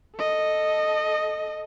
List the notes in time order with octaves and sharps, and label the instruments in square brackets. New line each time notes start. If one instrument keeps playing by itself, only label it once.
[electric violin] A4 D#5